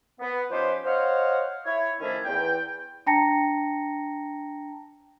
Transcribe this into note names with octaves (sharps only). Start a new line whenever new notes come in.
B3
F3 C#4 D#4 G4 B4 C5
C5 C#5 D#5 F5 F#5
E4 C#5
D#3 F3 A3 C#4 D4 E4
E2 G5
D4 G5 A5 A#5 A#6 C#7